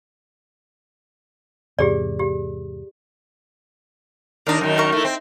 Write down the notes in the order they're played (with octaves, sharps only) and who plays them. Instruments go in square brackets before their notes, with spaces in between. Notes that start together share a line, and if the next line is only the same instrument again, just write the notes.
[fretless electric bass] E2 G#2 C3 [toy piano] G4 G#4 D5
[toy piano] G4
[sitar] D#2 D4 [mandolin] D#4 A#4
[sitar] F#2 D#3
[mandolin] A#4 C#6
[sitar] A3 E4
C4